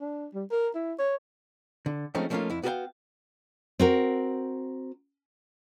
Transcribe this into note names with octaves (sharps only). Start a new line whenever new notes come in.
D4
G3
A#4
E4
C#5
D3
F3 G#3 A3 C4 C#4 D#4
F3 A3 A#3 C#4 D#4 F4
F2 E4
B3 F#4 G4 B4 F5 G5
C4 F#4 A#4